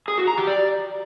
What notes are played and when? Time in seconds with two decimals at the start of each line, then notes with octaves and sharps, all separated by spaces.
0.08 G#4
0.18 F#4
0.28 A#5
0.37 G4
0.47 D5